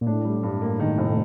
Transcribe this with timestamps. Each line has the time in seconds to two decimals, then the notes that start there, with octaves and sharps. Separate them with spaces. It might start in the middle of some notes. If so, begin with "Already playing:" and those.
0.01 A#2
0.07 A2 D4
0.25 G3
0.43 G2
0.62 A#3
0.80 D#3
0.98 F1